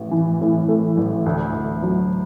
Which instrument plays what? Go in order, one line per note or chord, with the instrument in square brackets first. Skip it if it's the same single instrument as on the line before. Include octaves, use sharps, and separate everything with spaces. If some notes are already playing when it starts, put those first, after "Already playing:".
Already playing: [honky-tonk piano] A1
E3
A2
A3
A1
D2
D2
F#3